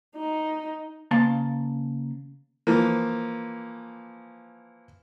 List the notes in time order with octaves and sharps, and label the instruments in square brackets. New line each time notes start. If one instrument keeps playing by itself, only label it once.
[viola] D#4
[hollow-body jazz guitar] C#3 A#3 A5 C6
[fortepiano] E3 F3 A#3